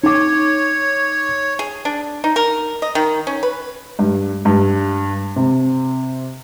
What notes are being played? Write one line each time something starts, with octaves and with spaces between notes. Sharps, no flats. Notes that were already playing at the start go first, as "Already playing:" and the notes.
D#4 C#5 D6
G#4
D4
D#4
A#4
D#5
D#3
C#4
B4
G2
G2
C3